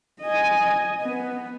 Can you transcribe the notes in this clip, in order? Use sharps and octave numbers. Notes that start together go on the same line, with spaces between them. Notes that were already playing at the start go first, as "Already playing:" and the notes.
D#5 G#5
B3